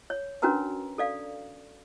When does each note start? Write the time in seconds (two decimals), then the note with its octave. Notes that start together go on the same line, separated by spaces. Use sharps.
0.10 C#5
0.42 C#4 D4 F#4 A#4 B4 A#5
0.98 A4 D5 F5